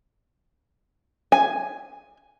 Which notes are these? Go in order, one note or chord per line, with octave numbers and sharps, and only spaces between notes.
G#5